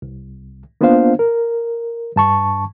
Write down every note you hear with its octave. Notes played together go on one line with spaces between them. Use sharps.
C2
A#3 B3 D4 F4 C5 F5
A#4
G2 A5 C#6